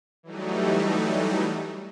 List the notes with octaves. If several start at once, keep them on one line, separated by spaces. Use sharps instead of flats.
E3 F#3 G3 A3 D#4